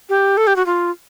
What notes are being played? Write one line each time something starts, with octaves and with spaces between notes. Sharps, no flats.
G4
A4
G4
F#4
F4